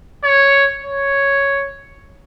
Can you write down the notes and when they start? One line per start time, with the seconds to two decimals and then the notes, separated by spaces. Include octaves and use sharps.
0.24 C#5
0.84 C#5